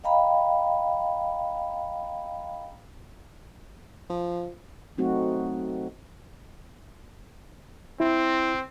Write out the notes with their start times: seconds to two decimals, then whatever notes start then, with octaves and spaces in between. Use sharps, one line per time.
0.04 D#5 F5 G5 A#5 B5
4.10 F3
4.97 F#3 A3 C4 D#4 F#4
8.00 C4 E4